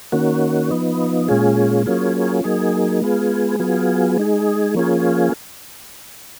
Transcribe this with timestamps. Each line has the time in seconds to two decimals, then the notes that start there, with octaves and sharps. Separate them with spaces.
0.12 D#3 A#3 C#4 F#4
0.71 F3 B3 D#4
1.28 A#2 G#3 C#4 F4 G#4
1.86 F#3 A#3 C#4 F4 G#4
2.44 F#3 A#3 D#4 G#4
3.02 G#3 B3 F4 G#4
3.59 F#3 B3 F4 G#4
4.18 G#3 D#4 G#4
4.75 F3 A#3 C#4 F4 G#4